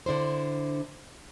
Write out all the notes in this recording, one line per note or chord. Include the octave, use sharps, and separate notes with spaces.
D3 D4 E4 C5